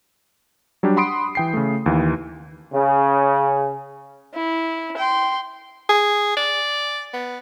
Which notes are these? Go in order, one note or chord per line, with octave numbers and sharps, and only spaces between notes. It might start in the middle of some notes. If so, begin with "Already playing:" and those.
F#3 G3 D4 G4
F#5 B5 C6 D#6 C7 D7
E3 G5 C7
C#3 A3
D#2 E3
C#3
E4
G5 C6
G#4
D5
B3